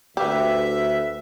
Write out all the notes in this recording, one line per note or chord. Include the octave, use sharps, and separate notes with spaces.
D2 G4 B4 E5 F5